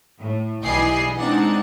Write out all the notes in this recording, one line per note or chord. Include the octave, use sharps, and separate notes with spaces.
A2
B1 E3 G3 G#4 D#5 C7
G#3 C4 D4 D#4 F#5